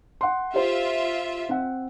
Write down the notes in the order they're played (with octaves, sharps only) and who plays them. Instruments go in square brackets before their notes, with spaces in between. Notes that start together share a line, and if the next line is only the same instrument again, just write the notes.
[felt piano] F#5 C6
[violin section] F4 E5 [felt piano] G4 C5
[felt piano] C4 F#5